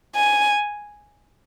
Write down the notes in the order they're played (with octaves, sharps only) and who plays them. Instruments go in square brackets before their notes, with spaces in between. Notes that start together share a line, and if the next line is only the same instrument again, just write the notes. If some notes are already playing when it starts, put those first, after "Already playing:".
[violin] G#5